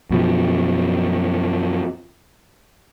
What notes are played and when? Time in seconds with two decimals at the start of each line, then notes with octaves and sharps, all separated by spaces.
0.11 F#2 B2 F3